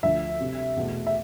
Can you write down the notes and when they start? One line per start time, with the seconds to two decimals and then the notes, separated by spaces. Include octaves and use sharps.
0.03 D2 D3 F3 E5
0.40 C3 G3 C4
0.76 E2 B2 A3
1.06 E5